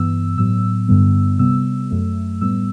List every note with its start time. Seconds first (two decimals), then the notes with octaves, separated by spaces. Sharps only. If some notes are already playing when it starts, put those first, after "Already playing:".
Already playing: G2 E3 B3 E6
0.37 A2 F#3 B3 E6
0.88 G2 D3 G3 B3
1.39 C3 G3 B3 E6
1.91 F#2 F#3 A3
2.41 A2 G3 B3 E6